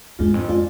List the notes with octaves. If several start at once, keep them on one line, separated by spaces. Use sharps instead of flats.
E2 G#2 G#3 D4 F4
F2
G#3 D4 F4